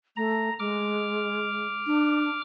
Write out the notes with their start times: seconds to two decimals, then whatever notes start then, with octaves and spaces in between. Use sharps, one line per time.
0.17 A3 A#5
0.59 G#3 D6 F6
1.87 D4